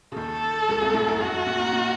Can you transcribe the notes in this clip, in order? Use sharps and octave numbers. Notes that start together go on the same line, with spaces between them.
C#3
D#2 D#3 A4
C#2 C#3
C2 C3
A1 A2
F#2
F2 F#4
F#2
A#1 A#2
A#1 A#2
A#2